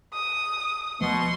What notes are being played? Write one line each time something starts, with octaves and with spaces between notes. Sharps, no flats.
D#6
D#2 B2 F3 A3 C6 C#6